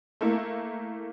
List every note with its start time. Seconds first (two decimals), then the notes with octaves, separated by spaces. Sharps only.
0.21 A3 A#3 E4